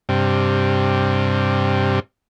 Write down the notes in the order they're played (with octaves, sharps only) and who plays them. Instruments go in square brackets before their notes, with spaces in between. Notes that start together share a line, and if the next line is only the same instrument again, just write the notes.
[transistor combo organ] G2 C3